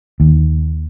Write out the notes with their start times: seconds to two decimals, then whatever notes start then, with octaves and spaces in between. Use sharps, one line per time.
0.20 D#2